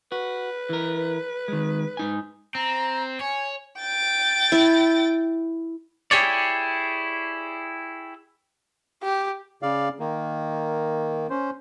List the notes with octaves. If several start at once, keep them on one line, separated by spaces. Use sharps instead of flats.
F#4 B4
E3 A#4
D#3 G#3
G#2 D#4 G#5
C4 A#5
C#5 G#5
G5 A6
E4
E4 G4 G#4 C#5 D5
G4
C#3 D5 F5
D#3 A#3
C#4 C5